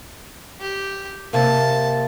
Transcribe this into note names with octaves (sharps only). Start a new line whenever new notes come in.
G4
C3 A#3 A5